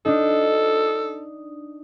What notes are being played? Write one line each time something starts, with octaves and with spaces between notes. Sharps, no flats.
D4 D#4 A4